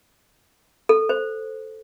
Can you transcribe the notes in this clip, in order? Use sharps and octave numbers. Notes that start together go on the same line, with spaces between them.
A4
C5